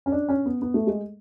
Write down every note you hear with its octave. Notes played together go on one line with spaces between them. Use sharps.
C#4
D4
C#4
B3
B3
A3
G#3